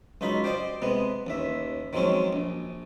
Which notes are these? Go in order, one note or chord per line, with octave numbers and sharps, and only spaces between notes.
C#2 F#3 D#4 F4 B5
G4 C5 D5 D#5
C3 G#3 B3
A1 D#2 E5
D#3 F3 F#3 G#3 C4 C#4
A#1